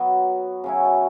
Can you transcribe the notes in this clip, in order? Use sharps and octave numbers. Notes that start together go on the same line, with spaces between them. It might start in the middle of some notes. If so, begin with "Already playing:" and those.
Already playing: F#3 B3 F#4
C#3 F#3 C#4 E4